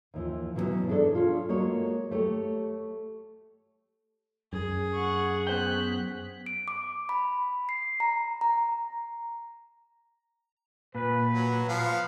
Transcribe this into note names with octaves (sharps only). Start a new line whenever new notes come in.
D#2 E3 F3
B2 E3 F#3 G3 B3 C#4
D4 G#4 A4 C5 D5
C#4 F4
G#3 A#3 F#4 C#5
A3 G4 C#5
F#2 G#4
F#5 C#6
B3 C5 G5 F#6 B6
D7
D6
B5
C7
A#5
A#5
A#2 B4
F#3
F3 B3 F5